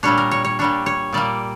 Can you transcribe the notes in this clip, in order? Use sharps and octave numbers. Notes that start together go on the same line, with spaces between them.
A#2 G3 D4 C#5
A#4
C#5
C#5
A#2 G3 D4 C#5
C#5
A#2 G3 A#3 D5